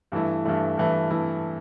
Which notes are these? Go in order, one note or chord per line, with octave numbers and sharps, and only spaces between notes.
G2 E3 A3 E4
G2 E3 A3 E4
G2 E3 A3 E4
E3 A3 E4